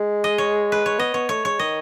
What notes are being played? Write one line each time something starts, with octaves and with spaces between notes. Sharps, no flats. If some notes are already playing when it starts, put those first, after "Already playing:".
Already playing: G#3
D#5
C#5
B4
C#5
B3 D#5
B3 C#5
A3 C#5
G#3 C#5
D#3 D#5